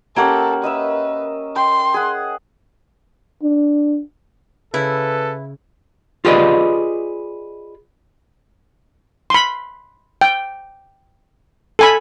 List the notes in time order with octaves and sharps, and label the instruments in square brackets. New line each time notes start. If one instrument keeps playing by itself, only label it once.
[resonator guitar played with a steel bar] A#3 G4 F#5 [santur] C#4 A#4 E5 [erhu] A4
[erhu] B4 [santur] D#5 E5 E6
[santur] G5 [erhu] C6
[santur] G#4 F#5
[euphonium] D4
[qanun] C#3 [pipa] E4 [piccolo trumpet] A4 [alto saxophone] B4
[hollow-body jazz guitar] F4 G4 G#4 B4 D5 D#5
[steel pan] B5 C6
G5
A4 G#5 B5